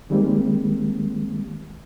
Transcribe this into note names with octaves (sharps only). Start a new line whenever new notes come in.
D#3 G3 G#3 A#3 C4